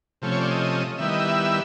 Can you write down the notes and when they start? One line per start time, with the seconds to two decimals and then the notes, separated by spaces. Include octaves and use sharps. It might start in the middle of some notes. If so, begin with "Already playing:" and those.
0.22 C3 F3 A3 C#4
0.32 C#5
0.41 D5
0.51 D#5
0.98 D#3 G3 B3 E4 E5
1.09 D#5
1.20 E5